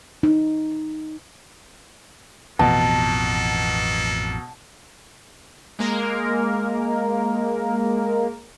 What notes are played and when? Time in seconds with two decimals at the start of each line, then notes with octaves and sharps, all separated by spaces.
0.23 D#4
2.59 A1 F2 B2 E3 A#3 A4 A5
5.79 G#3 A#3 A#4